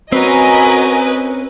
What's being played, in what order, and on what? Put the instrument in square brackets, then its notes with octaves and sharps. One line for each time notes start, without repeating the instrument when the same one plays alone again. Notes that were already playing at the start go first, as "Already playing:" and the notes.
[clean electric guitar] C4 C#4 [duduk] F#4 [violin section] A#4 D#5 G#5 [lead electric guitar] B4